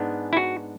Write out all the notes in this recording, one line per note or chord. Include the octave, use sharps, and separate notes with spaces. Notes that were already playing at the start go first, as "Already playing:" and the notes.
Already playing: G#2 G#3 B3 D4
E4
F#4